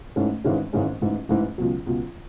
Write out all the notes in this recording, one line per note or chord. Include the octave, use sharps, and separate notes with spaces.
G#2 E3 A3 C#4
G#1 G#2 E3 G#3 C#4
G#1 G#2 E3 G#3 C#4
A1 G#2 E3
A1 G#2 E3
C#2 B2 F#3
C#2 B2 F#3